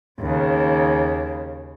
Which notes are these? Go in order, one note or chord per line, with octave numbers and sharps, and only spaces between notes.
D#2 C#3